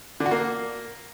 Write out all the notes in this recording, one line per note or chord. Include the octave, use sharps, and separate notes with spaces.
D3
F#4
A#3